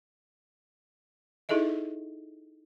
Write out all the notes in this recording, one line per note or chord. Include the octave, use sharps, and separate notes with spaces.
D#4 E4 G#4 A4 D#5 E5